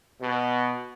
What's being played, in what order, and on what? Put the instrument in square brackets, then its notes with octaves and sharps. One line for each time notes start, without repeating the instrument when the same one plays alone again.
[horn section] B2